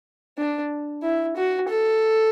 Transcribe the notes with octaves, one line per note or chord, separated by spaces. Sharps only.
D4
E4
F#4
A4